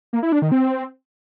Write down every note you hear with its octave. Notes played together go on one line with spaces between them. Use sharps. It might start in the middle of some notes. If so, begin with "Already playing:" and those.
A#3
E4
D4
D#3
C4